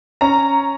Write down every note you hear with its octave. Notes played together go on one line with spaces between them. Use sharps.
C#4 A#5